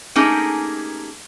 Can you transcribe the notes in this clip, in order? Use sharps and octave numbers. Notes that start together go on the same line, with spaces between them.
A3 A#3 C#4 D#4 G4 G#4